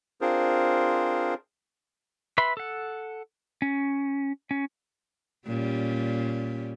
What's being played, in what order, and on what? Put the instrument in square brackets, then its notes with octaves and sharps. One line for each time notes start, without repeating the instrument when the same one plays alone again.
[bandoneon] C4 D4 F4 G#4 A#4 C5
[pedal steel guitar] B4 E5 B5 C6
A4 F#5
C#4
C#4
[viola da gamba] A#2 G3 C#4